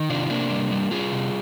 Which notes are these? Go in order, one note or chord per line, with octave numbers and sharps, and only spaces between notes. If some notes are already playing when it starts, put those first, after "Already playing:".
Already playing: D#3
C3 D4 F4
D#4
C3 A#3 D4
G3
G3
G3 F4 G#4
C3